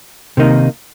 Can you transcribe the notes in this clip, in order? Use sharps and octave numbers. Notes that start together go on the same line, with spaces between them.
C3 D#3 A#3 D#4